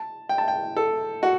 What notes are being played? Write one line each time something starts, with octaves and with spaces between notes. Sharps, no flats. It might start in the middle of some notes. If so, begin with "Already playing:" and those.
Already playing: A5
G5
A5
G5
A4
F#4